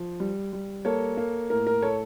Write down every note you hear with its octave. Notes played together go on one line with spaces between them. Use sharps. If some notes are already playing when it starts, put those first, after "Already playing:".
Already playing: F3
G3
G3
A#3 A4 C#5
A#3
A2 A#4
A#4
A4 C#5